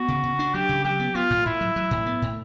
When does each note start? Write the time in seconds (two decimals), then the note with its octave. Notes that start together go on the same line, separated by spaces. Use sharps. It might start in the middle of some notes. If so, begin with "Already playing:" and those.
Already playing: B3 F#4
0.08 C#3
0.24 C#3
0.39 D4
0.54 F#3 G4
0.69 C#3
0.84 F#3 G4
1.00 B3
1.15 B3 F4
1.30 A2
1.46 A2 E4
1.61 F#3
1.76 F#3
1.91 A2
2.06 B3
2.22 A2